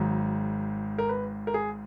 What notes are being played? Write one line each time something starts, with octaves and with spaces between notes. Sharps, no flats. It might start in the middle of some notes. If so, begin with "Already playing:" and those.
Already playing: G#1 G#2 F#3
A#4
B4
A#4
G#4